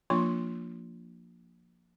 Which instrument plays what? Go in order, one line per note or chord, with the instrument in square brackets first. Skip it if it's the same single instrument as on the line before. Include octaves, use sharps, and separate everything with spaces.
[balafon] F3 A#3 D4 F4 C6